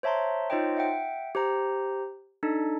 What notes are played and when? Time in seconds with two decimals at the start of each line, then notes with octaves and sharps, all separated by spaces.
0.03 C5 C#5 E5 A5 A#5 C6
0.50 D#4 F4 C5 C#5 D#5 G5
0.77 E5 F#5 G5
1.35 G4 C5 A#5
2.43 D4 D#4 A4